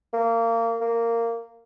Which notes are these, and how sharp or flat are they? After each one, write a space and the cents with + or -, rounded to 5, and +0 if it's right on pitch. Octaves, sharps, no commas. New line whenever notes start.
A#3 -25
A#3 -15